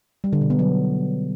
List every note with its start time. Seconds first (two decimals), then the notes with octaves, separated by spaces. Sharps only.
0.24 G3
0.33 D3
0.41 B2
0.50 B3
0.59 F#3